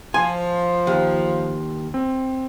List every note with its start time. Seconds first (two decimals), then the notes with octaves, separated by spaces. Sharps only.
0.14 F3 G#5 C6
0.87 D#2
1.94 C4